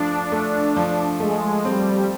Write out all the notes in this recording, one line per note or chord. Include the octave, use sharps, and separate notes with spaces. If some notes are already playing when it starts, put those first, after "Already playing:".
Already playing: F3 A3 D4
A3
F3
G#3 A3
G3 C4